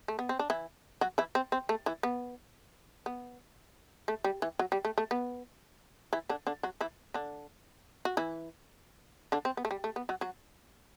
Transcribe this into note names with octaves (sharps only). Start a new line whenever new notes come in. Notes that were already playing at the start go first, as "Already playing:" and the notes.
A3
B3
C4
D4
E3 E4
F#3 F#4
E3 E4
C4
C4
A3
E3 E4
B3
B3
A3
G3
E3
F#3
G3
A3
A3
B3
E3 E4
D3 D4
D3 D4
F#3 F#4
E3 E4
D3 D4
F#4
E3 E4
D3 D4
C4
B3
A3
G3
A3
B3
F#3 F#4
F#3 F#4